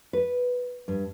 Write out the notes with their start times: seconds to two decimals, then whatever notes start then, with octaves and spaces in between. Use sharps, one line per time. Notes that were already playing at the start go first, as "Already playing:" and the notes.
0.13 B4
0.88 G2